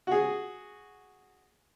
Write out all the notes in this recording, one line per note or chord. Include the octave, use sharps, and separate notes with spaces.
F#4 G#4